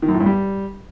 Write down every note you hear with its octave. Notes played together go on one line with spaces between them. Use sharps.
D#3
F#2
A2
G2
G3